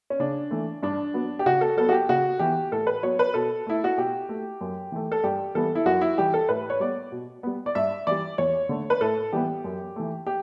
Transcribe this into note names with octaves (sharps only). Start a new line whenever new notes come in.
C#4
C#3 D4
E3 A3
G2 D4
F#3 B3
G4
C#3 F#4
A4
F#3 B3 A4
F#4
G4
C#3 F#4
E3 B3 G4
A2 A4
B4
F#3 B3 C#5
B4
B2 A4
A3 E4
F#4
B2 G4
A3
F#2
E3 A3
A4
G2 G4
E3 G3 B3 A4
E4
F#2 F#4
E4
E3 G3 G4
A4
A2 B4
C#5
G3 B3 D5
B2
G3 B3
D5
G2 E5
E3 G3 D5
E2 C#5
D3 A3
B4
A2 A4
E3 G3 B3 G4
F#2
E3 A3
G4